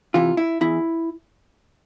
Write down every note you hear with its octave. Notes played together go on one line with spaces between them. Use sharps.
C3 E3 F4
E4
E2 E4